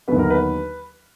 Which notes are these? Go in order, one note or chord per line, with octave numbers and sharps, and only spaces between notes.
D#2 D3 F#3 B3 B4
A#4
B4